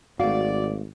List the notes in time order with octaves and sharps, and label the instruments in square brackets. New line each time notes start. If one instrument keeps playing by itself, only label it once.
[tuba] G#1 [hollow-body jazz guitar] A3 F5 [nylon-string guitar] F#4 [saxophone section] D5